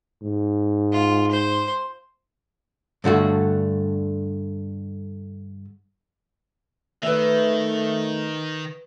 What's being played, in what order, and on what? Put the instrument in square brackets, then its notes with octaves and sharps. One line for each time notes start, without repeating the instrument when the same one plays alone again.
[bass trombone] G#2
[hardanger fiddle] F4
C5
[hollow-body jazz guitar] G2 D3 A3 F#4
[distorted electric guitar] D#3 [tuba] A3 [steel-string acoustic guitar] B4 E5